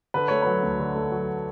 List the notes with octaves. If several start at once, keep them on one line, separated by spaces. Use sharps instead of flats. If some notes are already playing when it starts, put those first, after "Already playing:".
D3 B4
A3 C#5
F#3 B4
D2
D3
A3
F#3